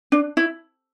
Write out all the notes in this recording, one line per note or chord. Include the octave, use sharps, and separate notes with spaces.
D4
E4